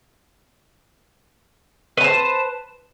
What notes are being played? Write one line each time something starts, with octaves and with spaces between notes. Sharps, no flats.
B4 C5 A5